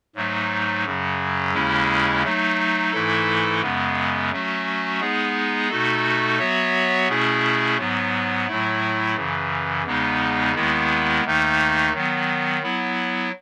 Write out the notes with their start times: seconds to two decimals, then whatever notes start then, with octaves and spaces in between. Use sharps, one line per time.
0.15 G#2 F#3 A3 D#4
0.85 F#2 C#3 F#3
1.54 D#2 C#3 G#3 C#4 E4
2.24 F#3 A3 D#4
2.92 G#2 E3 A3 E4 A4
3.62 F#2 C#3 G#3 B3
4.32 F#3 A3 C#4 F#4
5.00 G#3 B3 D#4 G#4
5.70 B2 A3 D#4 F#4 A4
6.39 F#3 B3 F#4 C#5 E5
7.08 B2 A3 C#4 E4 G#4
7.78 G#2 F#3 B3
8.46 A2 F#3 A3 E4
9.16 F#2 C#3 E3
9.85 E2 C#3 G#3 B3 D#4
10.54 D#2 D#3 G#3 B3 E4
11.24 D#2 D#3 A3 D#4
11.93 D#3 F#3 B3
12.63 F#3 B3 E4